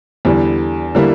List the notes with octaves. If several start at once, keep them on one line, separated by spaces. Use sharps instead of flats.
E2 D3 G3
D3 G3 A#3 E4